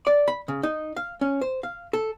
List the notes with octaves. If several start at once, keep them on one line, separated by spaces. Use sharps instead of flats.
D5
B5
C#3
D#4
F5
C#4
C5
F5
A4